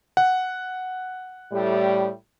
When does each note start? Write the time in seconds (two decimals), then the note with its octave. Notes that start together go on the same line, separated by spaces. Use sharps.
0.17 F#5
1.52 A2 G3